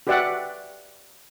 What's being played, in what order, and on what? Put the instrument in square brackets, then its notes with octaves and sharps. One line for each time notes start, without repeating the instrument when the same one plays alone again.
[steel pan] F#4 G4 B4 D5 E5 F#5